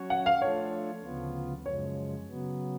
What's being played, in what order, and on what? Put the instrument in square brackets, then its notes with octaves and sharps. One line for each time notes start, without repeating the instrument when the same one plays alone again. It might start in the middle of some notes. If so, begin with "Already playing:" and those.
Already playing: [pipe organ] F#3 C#4 F#4 C#5
[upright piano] F#5
F5
[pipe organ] F3 A3 D4 F4 A4 [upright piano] C#5
[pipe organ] D2 C#3 F3 B3 F4
[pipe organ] F#2 C#3 F3 G#3 [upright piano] C#5
[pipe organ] C#3 F#3 B3